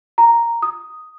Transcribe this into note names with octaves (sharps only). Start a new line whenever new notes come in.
A#5
D#6